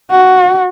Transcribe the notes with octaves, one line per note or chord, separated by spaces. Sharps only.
F#4